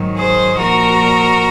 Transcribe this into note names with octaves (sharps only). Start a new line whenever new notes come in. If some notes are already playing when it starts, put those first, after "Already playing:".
Already playing: G#2 D#3 F#3
G#4 C5
A#2 F3 F#4 A#4